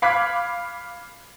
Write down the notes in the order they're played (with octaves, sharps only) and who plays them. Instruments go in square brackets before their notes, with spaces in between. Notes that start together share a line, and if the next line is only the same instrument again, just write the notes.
[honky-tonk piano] F5 B5 D6 F#6 G#6 B6